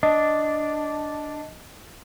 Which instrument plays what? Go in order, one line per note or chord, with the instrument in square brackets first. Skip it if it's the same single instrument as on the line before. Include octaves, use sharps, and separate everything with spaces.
[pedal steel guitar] D4 [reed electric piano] D#5